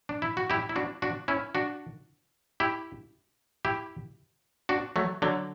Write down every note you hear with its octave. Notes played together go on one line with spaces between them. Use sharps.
D4
E4
F#4
E4 G4
E4
D4 F#4
D4 F#4
C#4 E4
D4 F#4
E4 G4
E4 G4
D4 F#4
F#3 A3
D3 F#3